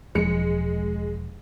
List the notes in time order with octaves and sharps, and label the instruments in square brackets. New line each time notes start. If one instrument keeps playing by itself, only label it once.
[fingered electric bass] E1 F3 F#3 [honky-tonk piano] G#3 C#7